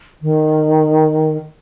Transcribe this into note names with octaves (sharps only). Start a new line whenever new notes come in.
D#3